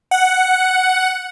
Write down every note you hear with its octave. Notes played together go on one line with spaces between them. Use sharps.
F#5